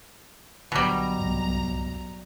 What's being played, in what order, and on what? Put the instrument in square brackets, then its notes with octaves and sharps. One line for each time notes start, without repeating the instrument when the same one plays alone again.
[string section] B1 A#5 [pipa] B2 G3 [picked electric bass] D3
[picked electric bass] C2 F2 G#2